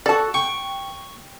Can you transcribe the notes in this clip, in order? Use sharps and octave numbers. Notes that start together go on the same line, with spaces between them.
F#4 A4 D5 A5
G5 C#6